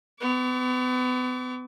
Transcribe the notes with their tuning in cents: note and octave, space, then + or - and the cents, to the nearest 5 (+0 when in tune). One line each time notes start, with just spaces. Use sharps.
B3 +35 D6 -45